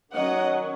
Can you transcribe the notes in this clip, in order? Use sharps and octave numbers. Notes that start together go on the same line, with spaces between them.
D#3 F#3 C#4 D#5 F#5